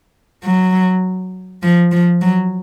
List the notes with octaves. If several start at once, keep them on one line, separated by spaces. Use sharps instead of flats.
F#3
F3
F3
F#3